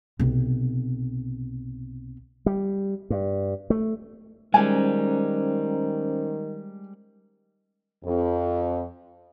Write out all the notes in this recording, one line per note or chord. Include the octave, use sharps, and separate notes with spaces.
B1 C3
G3
G2
A3
D#3 G3 G#3 C#4 C5 G#5 A#5
F2